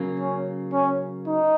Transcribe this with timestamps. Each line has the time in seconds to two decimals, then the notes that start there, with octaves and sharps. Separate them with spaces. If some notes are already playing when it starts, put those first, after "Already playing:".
Already playing: C#3 F#3 A#3
0.19 C#4
0.72 C#4
1.27 D#4